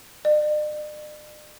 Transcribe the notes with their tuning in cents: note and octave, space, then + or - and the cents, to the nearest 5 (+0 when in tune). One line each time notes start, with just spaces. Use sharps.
D5 +45